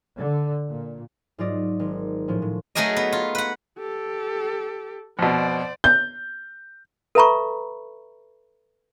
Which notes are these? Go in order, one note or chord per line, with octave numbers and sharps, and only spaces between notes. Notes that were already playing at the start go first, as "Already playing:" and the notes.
D3
A#2
G#2 F#3 F4 D5 D#5
G#1
A2 F3 C#4
A2
F#3 A3 D#4 G#4 A#4 D#5
B3
F4
B4 F#5
G4 A4
F2 B2 C5 D5
G6
A4 B4 E5 A#5 B5 C#6